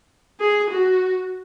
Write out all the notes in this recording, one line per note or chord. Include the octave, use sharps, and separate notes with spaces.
G#4
F#4